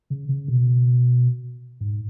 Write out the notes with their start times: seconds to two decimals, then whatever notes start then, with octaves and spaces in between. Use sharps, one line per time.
0.10 C#3
0.29 C#3
0.48 B2
1.81 G#2